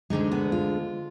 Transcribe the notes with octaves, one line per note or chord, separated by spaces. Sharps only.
D2 D3 G#3 D#4
B3
F4